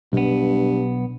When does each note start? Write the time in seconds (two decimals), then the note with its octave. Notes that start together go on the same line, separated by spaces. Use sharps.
0.13 B1 G2 B3